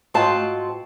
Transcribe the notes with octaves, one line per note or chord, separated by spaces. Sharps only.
G#2 C4 F4 F#4 F5 A5